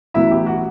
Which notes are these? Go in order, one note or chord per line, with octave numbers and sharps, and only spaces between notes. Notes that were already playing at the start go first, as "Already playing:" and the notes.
A1 A2 F#3 B3 E4 E5
G4
F#4